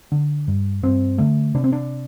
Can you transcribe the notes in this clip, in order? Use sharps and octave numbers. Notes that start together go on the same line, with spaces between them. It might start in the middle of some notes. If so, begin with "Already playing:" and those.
D3
G2
G2 C4
D3 A3
C3 D4
C4
D4